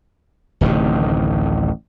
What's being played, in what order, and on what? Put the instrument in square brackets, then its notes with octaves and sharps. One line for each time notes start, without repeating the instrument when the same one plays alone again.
[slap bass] D1 A1 C3 D#3